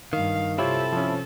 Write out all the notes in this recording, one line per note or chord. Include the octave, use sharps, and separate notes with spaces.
G2 D#3 F5
C3 C4 E4 F4 G4 A4 C#5
F3 C#4